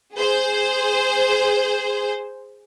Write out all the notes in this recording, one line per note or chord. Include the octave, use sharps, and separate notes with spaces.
G#4 C5